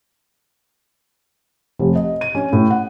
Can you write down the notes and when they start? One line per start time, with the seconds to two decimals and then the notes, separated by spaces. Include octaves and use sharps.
1.79 F1
1.95 D#5
2.21 D#7
2.35 C#4
2.53 A2
2.70 F#5